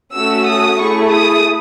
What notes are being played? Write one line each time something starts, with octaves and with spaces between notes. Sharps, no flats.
A3 C#4 F#4 E6
D#6
A3 E4 G#4 C#6
D#6